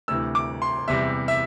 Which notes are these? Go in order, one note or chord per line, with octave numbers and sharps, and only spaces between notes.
D2 C3 E3 E6
D6
C6
E2 C3 G3 E5
E5